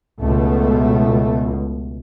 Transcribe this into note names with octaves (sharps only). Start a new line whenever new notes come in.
C#2 B2 A3